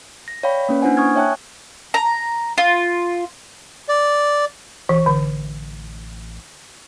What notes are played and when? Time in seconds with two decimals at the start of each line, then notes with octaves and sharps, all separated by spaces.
0.28 A#6
0.43 C#5 D5 F5 G5 B5
0.69 A#3 C#4 B4
0.82 A#3 D4 E4 C5 F#5 G#5
0.97 G#5 C#6 D#6 F6 G#6
1.16 C#5 E5 G5 A5 F#6
1.94 A#5
2.58 F4
3.89 D5
4.89 E1 E3
5.06 A1 D3